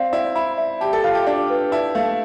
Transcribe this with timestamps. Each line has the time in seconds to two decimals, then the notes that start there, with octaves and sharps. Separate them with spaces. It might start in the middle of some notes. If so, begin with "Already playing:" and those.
Already playing: C4 D5 F5 G5
0.13 E4 D5
0.35 E4 B5
0.58 E5
0.81 G4 A5
0.93 A4
1.04 F4 F5
1.15 G4
1.27 D4 D5
1.50 B4
1.72 E4 A5
1.95 A3 F5